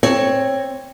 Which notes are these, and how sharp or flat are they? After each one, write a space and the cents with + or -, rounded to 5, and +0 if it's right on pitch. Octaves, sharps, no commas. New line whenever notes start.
C4 +20 C#5 +0